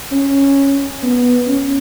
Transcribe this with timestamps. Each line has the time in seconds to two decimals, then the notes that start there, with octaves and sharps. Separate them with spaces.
0.12 C#4
1.03 B3
1.47 C#4